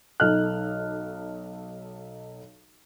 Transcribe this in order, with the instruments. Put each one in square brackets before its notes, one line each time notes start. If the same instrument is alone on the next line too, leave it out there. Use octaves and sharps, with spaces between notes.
[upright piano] B1 D#4 A4 D#5 F6 F#6